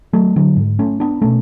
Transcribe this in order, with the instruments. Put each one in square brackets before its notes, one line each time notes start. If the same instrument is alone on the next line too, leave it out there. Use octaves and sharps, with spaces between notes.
[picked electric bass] F#3 A3
D3 F#3
G#2
A3 C#4
B3 D4
B2 A3 C#4